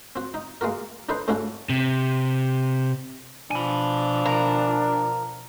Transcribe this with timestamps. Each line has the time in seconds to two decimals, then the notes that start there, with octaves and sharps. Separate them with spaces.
0.16 C4 F#4
0.34 D#4
0.61 G#3 A#3 F#4 A#4
1.09 D4 D#4 A4 B4 C5
1.28 G#2 A3 C#4 D4 E4 F#4
1.69 C3
3.51 B2 F3 D4 G#5 B5
4.25 A#4